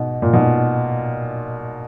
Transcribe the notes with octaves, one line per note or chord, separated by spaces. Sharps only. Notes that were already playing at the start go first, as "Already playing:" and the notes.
Already playing: G#2 B2
A#2
G#2 B2